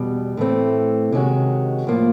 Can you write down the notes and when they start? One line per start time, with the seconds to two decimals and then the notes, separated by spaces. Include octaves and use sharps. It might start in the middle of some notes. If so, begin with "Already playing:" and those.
Already playing: E2 B2 G3
0.37 A2 E3 A3 C4
1.12 C3 D#3 G#3 C#4 F#4
1.87 A2 F3 A#3